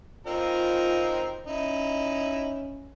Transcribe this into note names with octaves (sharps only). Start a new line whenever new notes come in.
C4 D#4 F4 A#4
C#4 D#4 E4